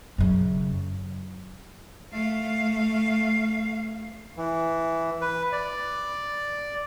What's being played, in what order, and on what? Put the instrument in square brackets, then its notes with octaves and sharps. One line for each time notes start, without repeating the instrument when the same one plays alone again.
[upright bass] F#2 C#3
[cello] A3 F5
[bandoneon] E3
B4
D5